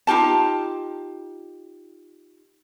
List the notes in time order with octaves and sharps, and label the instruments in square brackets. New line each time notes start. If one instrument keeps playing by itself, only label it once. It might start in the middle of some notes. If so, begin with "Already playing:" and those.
[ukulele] D#4 F4 G4 A5